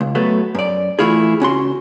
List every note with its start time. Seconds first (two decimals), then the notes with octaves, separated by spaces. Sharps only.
0.01 C#2
0.15 F#3 A3 B3
0.55 F#2 D5
0.99 E3 A3 E4 F4 G#4
1.40 C#2 C#4 F#4 C6